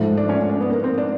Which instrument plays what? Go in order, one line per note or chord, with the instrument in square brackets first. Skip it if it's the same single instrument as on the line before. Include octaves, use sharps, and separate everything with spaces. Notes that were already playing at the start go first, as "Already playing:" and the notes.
Already playing: [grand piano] G#2 F3 A3
[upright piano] D4
C#4
D4
B3
A#3
C4
D4